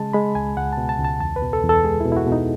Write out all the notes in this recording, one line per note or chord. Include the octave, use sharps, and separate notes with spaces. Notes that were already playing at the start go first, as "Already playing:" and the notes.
Already playing: C#3 G#3 A5
G#3 B5
C#2 G#5
C#2 F#5
B2 A5
A5
C#2
A5
E2 A5
B4
B2
A4
E2
A4
G#3 G#4
E4
B2
E4
F#4
B2
D#4